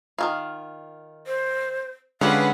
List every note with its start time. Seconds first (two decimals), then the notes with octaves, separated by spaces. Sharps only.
0.18 D#3 E3 F4
1.27 C5
2.21 D3 G#3 C#4 F4 G4 B4 F5 F#5